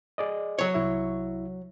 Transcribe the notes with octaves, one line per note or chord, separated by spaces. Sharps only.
G#4 D5 D#5
F#3 C#5
C2 E4 E5